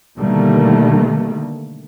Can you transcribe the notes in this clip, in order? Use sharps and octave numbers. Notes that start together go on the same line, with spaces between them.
B2 D3 D#3 G3 A3 A#3